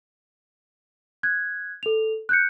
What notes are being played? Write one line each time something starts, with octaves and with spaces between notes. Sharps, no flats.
F#6 G#6
A4 F7
F#6 G6 C#7